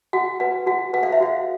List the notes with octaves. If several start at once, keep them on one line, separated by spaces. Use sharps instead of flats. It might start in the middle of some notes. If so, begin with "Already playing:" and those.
F#4 F#5
B4 F#5
F#4 F#5
B4 F#5
F5
E5
F#4 F5